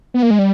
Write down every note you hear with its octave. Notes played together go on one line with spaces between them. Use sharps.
B3
A#3
G#3
G3